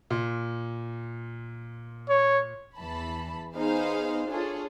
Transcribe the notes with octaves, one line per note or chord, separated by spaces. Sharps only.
A#2
C#5
E2 E3 A5 B5
B3 D#4 G#4 C5 F5
D4 F4 G#4 A4 C#5